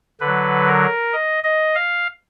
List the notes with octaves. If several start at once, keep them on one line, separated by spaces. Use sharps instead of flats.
D3 B4
F#3
A#4
D#5
D#5
F5